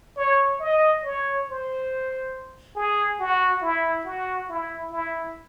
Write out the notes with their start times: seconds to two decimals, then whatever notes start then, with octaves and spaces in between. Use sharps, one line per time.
0.17 C#5
0.60 D#5
1.03 C#5
1.47 C5
2.76 G#4
3.20 F#4
3.62 E4
4.05 F#4
4.49 E4
4.91 E4